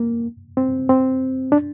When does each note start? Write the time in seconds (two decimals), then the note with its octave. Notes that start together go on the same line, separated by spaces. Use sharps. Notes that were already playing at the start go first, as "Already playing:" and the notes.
Already playing: A#3
0.57 C4
0.89 C4
1.52 D4